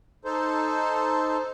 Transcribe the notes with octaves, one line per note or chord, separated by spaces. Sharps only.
D#4 A4 C5